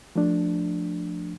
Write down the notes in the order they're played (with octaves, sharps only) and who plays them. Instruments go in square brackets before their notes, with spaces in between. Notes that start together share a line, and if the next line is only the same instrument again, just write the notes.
[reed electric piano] F3 A3 D4